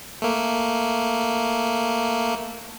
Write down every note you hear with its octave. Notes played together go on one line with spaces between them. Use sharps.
A3 A#3